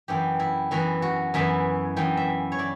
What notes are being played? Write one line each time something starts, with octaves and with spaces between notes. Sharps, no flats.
F#2 E3 B3 E4 G4
E4
F#2 E3 B3 E4 F#4
F#4
F#2 E3 B3 E4 E5
F#2 E3 B3 E4 G5
E5
C#5
E4 D5